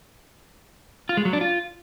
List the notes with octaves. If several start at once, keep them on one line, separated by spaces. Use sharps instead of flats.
F4
G#3
F#3
D4
F4